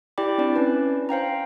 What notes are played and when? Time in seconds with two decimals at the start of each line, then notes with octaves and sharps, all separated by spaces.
0.18 E4 G4 D5 G5 B5 D6
0.38 C4 D4 E4 D5
0.56 C#4 D4 B4
1.09 C5 F5 G5 A#5